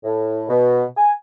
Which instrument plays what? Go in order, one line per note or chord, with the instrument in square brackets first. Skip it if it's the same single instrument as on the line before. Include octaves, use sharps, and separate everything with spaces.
[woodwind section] A2
B2
G#5